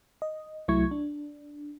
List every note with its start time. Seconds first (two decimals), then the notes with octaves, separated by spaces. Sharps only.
0.22 D#5
0.68 C2 F#3 A3 E4 C#6 G#6
0.91 D4